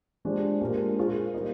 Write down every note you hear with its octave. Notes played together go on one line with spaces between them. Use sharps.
F3 G#3 D4 G4 C5
A#2 G#3 D4 G4 A#4
A#3 F4 G#4 C5
G3 A#3 D#4